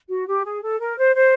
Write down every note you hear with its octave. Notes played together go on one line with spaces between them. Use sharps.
F#4
G4
G#4
A4
A#4
C5
C5